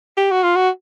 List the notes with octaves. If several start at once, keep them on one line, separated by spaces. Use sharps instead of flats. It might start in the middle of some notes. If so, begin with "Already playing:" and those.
G4
F#4
F4
F#4